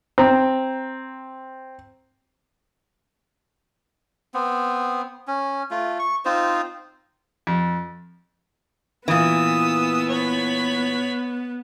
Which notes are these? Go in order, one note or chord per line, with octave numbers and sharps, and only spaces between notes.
C4 A#5
B3 C4
C#4
A3 F4
C#6
C4 D#4 F4 C5
F2
A#2 E3 B3 D#6 E6
C#5 B5